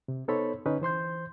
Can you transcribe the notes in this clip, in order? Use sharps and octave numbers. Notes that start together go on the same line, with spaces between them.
C3
B3 D#4 A4 C5 C#5 B5
D3 C#4 D#4 B4
E3 C5 C6 G6